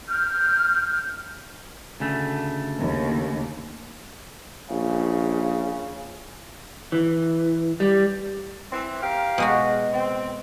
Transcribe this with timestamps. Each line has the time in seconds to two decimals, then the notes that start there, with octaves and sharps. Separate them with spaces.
0.09 F6 G6
2.00 D2 C#3 A3
2.80 D#2
4.70 A#1 C#3
6.92 E3
7.80 G3
8.71 E3 C4
9.02 G4 A#4 F5
9.38 B2 G#3 F#4
9.93 C4